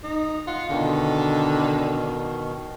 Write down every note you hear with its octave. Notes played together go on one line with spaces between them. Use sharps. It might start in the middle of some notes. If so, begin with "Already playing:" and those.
D#4
F4 F#5
B2 D3 D#3